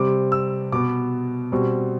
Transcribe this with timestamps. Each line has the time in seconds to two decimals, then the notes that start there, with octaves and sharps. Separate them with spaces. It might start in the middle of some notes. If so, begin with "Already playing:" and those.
Already playing: C3 G3 C4 D6
0.32 E6
0.72 B2 B3 D6
1.52 B2 G3 C4